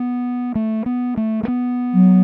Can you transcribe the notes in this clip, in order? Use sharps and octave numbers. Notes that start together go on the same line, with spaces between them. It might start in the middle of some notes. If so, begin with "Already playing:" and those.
Already playing: B3
A3
B3
A3
A3
B3
F#3